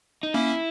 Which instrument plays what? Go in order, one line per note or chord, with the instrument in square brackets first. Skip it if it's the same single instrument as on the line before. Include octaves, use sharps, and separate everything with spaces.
[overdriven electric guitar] D#4
[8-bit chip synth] A#3 C#4 [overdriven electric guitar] E4